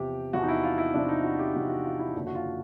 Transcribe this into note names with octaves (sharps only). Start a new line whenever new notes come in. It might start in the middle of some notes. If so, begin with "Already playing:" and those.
Already playing: E2 C3 F3 G4
E2 C3 F3 F#4
D#4
E4
F4
E4
E2 C3 F3 D4
D#4
F#4
G4
E2 C3 F3 F#4
F#4
F4
E4
F#1 F#2 D3 F3 F#4
F#4
F4